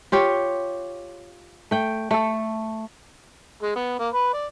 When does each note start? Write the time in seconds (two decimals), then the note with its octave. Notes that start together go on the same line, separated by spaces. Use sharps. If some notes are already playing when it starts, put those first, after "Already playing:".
0.12 F4 G4 C#5
1.71 A3 G5
2.11 A3 A4
3.62 G#3
3.76 B3
4.00 A#3
4.13 B4
4.33 D5